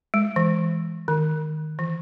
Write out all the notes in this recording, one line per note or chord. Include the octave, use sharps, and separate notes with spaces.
G#3
E3
D#3
E3